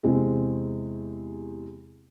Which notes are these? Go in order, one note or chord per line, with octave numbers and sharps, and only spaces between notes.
E2 C3 G#3 C4